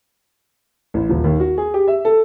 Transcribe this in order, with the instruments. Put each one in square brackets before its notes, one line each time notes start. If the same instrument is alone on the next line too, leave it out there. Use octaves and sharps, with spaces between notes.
[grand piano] A1
D#1
D#2
F#4
G#4
G4
E5
A4